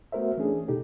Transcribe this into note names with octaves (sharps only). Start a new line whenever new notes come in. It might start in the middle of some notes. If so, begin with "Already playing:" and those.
A3 B3 F#4 A#4 C5 E5
E3 A3 C#4 D4 G#4
B2 D#4 G4 A4